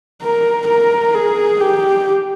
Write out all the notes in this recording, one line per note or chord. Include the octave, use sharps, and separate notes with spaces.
A#4
A#4
G#4
G4